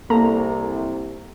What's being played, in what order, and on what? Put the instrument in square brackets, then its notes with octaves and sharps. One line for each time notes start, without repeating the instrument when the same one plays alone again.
[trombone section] C2 [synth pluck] A#3 A4 A#5